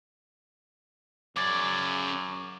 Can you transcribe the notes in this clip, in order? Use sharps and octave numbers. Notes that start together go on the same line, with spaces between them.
F#2 C#3 D5 D6 G#6 A6